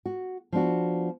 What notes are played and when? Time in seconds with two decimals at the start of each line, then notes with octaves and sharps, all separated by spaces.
0.05 F#4
0.52 F3 B3 D4 F#4